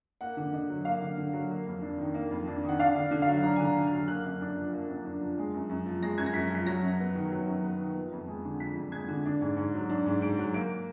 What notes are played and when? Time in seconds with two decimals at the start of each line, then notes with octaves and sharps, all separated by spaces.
0.21 A#3 F#5
0.37 D3
0.53 D3 D#5
0.69 F#3
0.85 A#3 F5
1.02 D3
1.18 D3
1.33 F#3
1.50 A#3
1.67 F2
1.82 D4
1.98 D#3
2.14 A#3
2.31 F2
2.48 D4
2.63 D#3
2.69 F#5
2.79 D4 F5
2.95 D3
3.11 D3
3.22 F5
3.28 F#3
3.43 D4 A#5
3.56 G#5
3.60 D3 A#5
3.77 D3
3.87 F#3 F6
4.08 A#3 F#6
4.25 F#2
4.41 D4
4.56 F3
4.73 A#3
4.88 F#2
5.05 D4
5.21 F3
5.38 G#3
5.54 F#2
5.69 F#2
5.86 F3
6.02 G#3 A#6
6.18 F#2 G#6
6.26 A#6
6.34 F#2 B6
6.50 F3 B6
6.66 F#3 A#6
6.83 F#2
6.99 B3
7.14 D#3
7.32 F#3
7.48 F#2
7.64 B3
7.80 D#3
7.95 F3
8.12 F2
8.27 G#3
8.44 D3
8.60 F3 B6
8.76 F2
8.92 G#3 G#6
9.08 D3
9.25 D4
9.41 G#2
9.57 G#2
9.74 F#3
9.89 D4
10.06 G#2
10.21 G#2 D7
10.38 F#3
10.54 A#3 D7